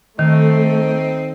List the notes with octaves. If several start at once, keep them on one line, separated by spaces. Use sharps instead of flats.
D#3 A3 C4 D#4